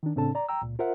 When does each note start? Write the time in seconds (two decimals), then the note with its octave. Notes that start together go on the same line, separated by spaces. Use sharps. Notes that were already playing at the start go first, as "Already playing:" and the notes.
0.03 D#3 D4
0.16 A2 C#3 C4 D4 A4 A5
0.35 D5 A#5
0.49 G5 A#5 E6
0.62 C#2 A#2
0.79 F4 A#4 C5 E5 F#5